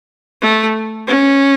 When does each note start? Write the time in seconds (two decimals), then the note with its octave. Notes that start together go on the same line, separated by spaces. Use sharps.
0.41 A3
1.07 C#4